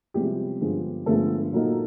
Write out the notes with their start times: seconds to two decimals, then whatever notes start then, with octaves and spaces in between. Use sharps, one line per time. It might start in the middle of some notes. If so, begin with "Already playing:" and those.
0.14 C3 F3 G3 G#3 B3 E4 G4
0.61 G2 D3 F3 G#3 B3
1.06 G2 D3 F3 G#3 A3 B3 A4
1.53 A#2 F#3 A#3 D#4